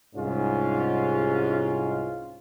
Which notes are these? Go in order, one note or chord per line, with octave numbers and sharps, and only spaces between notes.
C2 G#2 C#4 F4